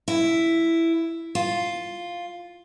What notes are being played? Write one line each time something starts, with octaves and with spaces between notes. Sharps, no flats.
E4
F4